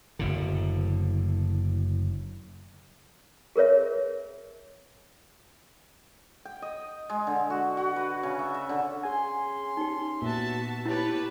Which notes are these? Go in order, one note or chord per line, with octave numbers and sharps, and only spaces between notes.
F#1 A2 D3
G#4 A#4 B4 C#5 E5
G5
D#5
G#3
D3
F#4
F#4
B4
C#3
E5
E5
D3
C#4 G#4 G#5 C6
D#4 G4
A#2 B3 F#4 E5 A5
C#4 E4 G4 B4 C#5 A5